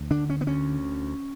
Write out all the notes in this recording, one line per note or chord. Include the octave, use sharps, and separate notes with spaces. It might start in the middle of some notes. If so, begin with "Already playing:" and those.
Already playing: D2
D3 D4
C#4
B3
D2 C#4